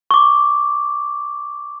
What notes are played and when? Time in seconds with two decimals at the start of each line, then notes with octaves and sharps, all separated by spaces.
0.11 C#6 D6